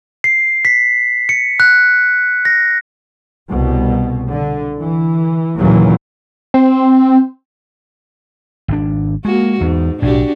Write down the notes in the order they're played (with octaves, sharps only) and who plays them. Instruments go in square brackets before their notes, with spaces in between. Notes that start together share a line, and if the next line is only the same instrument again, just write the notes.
[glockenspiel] C7
B6
C#7
F#6
A#6
[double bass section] C2 B2
D3
E3
D#2 A#2 C#3 E3 F#3
[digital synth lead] C4
[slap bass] G#1 B2 D4
[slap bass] G#3 [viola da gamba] A#3 F#4
[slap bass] E2 [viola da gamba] G#2
[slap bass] B1 A2 [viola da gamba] D4 F#4 G4